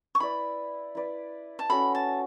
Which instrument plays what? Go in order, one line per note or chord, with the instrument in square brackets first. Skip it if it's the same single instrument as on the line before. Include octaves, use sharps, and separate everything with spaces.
[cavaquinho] C#6
[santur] E4 B4 D5 [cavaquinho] B5
[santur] E4 B4 D5
[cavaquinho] A5
[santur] C#4 F#4 A4 [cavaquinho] B5
[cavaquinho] A5